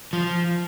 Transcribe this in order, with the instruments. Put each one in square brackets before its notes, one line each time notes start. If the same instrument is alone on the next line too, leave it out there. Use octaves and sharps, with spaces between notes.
[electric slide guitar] F3